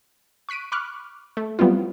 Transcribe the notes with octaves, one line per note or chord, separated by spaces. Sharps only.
C#6 F#6 B6 D7 D#7
B5 C#6 D6 F6 F#6
A3
F#3 G3 B3 C4 E4 F4